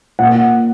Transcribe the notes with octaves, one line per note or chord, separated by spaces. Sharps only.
A#2 F#5